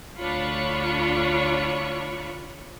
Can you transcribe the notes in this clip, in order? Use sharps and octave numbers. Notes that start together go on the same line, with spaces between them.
D2 D4 F4 C#5 B5 C#6